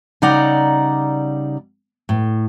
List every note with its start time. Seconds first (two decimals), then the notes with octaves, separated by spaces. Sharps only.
0.22 C#3 G3 D#4 D5 F#5 A#5
2.09 A2